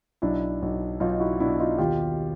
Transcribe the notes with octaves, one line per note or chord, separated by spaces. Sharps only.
B1 D4 E4
B1
B1 D#4 F4
E4 F#4
B2 D4 E4
D#4 F4
D#2 F4 G4